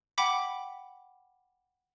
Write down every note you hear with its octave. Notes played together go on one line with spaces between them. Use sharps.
F#5 G5 B5 D6 B6